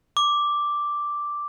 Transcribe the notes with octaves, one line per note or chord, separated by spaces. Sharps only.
D6